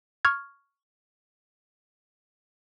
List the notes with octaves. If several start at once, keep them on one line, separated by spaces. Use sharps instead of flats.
C#6 F6 G#6